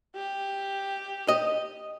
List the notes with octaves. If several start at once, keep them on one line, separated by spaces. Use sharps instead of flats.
G4
D#5